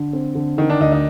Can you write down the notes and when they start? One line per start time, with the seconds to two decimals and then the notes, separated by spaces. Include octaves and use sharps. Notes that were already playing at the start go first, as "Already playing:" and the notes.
Already playing: D3
0.13 C4
0.35 D3
0.58 D3 D#3
0.70 D4
0.80 D2 D#4
0.92 D#4